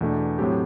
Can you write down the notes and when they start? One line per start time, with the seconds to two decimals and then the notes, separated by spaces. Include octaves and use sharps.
0.01 E2 B2 A3 D4
0.39 A2 F#3 C4 G4